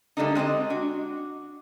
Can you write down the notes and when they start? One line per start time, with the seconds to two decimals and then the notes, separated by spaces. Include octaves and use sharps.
0.17 D3 G3 A3 A#3 D4 D#4
0.35 G#3 C4 G4 D#5
0.70 D4 F#4